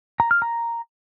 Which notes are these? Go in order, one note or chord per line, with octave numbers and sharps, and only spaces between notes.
A#5
F6
A#5